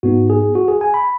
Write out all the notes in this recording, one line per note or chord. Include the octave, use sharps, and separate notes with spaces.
G#2 G#3 B3 D#4 F#4
G#4
F#4
G#4
G#5
B5